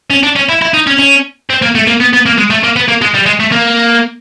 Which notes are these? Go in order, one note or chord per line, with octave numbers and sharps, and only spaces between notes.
C#4
D4
C#4
E4
E4
D#4
C#4
C#4
C4
A#3
A3
A#3
B3
B3
A#3
G#3
A3
A#3
B3
A#3
G#3
G3
G#3
A3
A#3